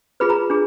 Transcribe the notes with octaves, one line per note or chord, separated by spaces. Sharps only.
F4 G#4 B4 B5
A#5
D4 G#4